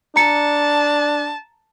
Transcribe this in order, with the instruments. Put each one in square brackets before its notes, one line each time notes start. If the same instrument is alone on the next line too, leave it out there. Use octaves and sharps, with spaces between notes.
[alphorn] D4 [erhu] A5 [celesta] A#5 C#7